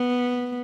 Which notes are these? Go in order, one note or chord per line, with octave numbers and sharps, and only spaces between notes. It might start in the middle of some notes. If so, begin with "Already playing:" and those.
Already playing: B3